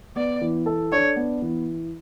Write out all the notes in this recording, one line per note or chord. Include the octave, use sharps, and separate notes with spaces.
B3 D5
E3
A4
D4 C#5
B3
E3